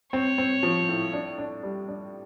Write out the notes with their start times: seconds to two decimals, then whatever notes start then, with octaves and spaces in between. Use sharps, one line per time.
0.13 C4 C#5
0.38 C4
0.63 F3
0.89 A2
1.13 D4
1.38 D4
1.63 G3
1.88 D4